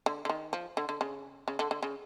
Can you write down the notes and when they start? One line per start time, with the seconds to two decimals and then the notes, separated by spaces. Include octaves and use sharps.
0.06 D3
0.25 D3
0.29 D#3
0.53 F3
0.77 D3
0.89 D3
1.01 C#3
1.48 C#3
1.59 D3
1.71 D3
1.83 C#3